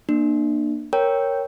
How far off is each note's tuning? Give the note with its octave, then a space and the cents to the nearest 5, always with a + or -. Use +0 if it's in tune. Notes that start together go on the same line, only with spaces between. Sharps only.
A#3 +10 D4 +30
A#4 +0 C#5 -5 G5 +0